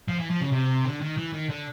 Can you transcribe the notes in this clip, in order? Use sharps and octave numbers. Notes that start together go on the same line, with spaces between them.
F3
E3
F3
C#3
C3
D3
D#3
E3
D#3
D3